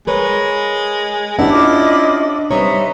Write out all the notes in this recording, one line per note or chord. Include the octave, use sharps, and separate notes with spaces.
G#3 A#4 B4 C#5
C#4 D4 E4 G4 F#5
F4 D#5 D6
G3 C4 D#4 B4 C#5 E5